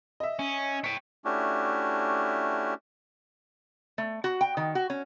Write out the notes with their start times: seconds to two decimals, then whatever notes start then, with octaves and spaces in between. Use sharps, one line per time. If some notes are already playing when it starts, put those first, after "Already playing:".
0.20 D#5 E5
0.39 C#4
0.84 C#5 G5 B6
1.25 A3 C#4 D4 E4 F#4 G4
3.98 A3
4.24 F#4
4.41 G5
4.57 D#3
4.75 F#4
4.90 C#4